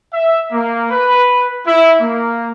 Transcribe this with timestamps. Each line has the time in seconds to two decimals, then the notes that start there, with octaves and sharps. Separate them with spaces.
0.14 E5
0.52 A#3
0.91 B4
1.67 E4
2.00 A#3